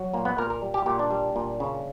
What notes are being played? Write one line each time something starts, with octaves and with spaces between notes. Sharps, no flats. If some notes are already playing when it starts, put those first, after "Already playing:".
Already playing: F#3
A#2 A#3
B3
A#2 A#4
A#4
G3
G4
A#2 G4
D4
G3
A#2
C#3